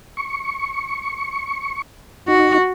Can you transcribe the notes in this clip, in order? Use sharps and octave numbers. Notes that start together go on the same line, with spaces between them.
C#6
D#4 F#4